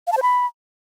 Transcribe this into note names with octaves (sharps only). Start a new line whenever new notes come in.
F5
A5
C5
B5